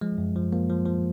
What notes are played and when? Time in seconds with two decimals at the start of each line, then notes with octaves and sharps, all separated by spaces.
0.01 F3 G#3
0.18 F#2
0.36 F3
0.53 F3 A#3
0.70 F3
0.86 F3